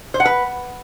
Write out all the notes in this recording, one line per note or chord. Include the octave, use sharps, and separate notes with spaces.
C5
F#5
B4